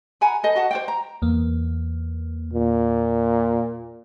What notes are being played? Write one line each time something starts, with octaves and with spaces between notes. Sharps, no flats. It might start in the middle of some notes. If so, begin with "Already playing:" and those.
F#5 G#5 A#5 B5
A4 C5 D#5
F#4 D#5 F#5 A5
C5 D5 G5
A#5
E2 A#3
A#2